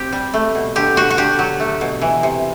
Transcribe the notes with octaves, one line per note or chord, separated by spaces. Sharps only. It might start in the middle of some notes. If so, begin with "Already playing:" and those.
Already playing: C4 G4
G3
A3
B2
D3 G4
D3 F#4
F#4
D3 G4
F#3
A3
B2
E3
C3